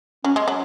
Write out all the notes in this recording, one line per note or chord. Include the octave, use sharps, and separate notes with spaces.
F#3 C#4
G#3
F#3